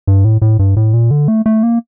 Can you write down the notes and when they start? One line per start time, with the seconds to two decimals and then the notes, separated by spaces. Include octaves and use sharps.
0.07 G2
0.25 A2
0.42 A2
0.59 G2
0.77 A2
0.94 A#2
1.11 D3
1.28 A3
1.46 A3
1.63 A#3